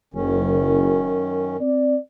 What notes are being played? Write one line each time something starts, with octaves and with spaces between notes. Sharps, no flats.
F#1 F#2 D#3 C#4
C4 D5